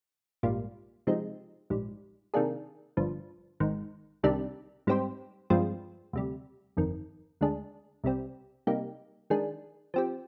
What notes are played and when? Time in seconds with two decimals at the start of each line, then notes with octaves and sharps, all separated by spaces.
0.43 A#1 G#2 G3 A#3 F4
1.07 C3 F3 G#3 C4 D#4
1.70 A#1 G#2 G3
2.34 C3 D#3 A#3 D4 G#4
2.97 G1 G2 F3
3.60 G#1 G#2 D#3
4.23 C2 C3 D#3 G3 D4
4.87 G#2 G3 C4 G4 C5
5.50 G2 F3 G#3 C4 F4
6.13 D2 C3 G3
6.77 G1 F2 D#3
7.41 D2 D3 G#3 D4 G#4
8.04 C2 C3 G3 C4
8.67 C3 G3 A#3 D#4 G4
9.30 D#3 G#3 D4 G#4
9.94 F3 C4 G4